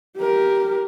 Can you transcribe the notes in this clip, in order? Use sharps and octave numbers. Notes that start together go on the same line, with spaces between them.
G4 A#4